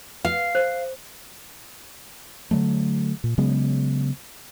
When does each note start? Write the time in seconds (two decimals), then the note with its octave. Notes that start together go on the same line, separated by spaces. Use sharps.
0.25 F5
0.55 C5
2.51 D3 E3 F#3 A3
3.24 A#2
3.38 C#3 F#3 G#3 B3